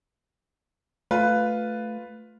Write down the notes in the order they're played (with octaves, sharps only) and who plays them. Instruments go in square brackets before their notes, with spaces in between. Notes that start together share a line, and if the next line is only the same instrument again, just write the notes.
[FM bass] A3 [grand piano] F4 B4